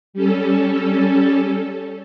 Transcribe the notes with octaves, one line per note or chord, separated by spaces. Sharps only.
G3 C#4 A4